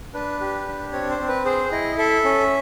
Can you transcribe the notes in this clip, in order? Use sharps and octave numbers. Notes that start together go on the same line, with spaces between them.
D4 B4
G4
D4
C4 C#5
C5
C4
B4
G#4 C5
E4 D#5
A4 E5
C#4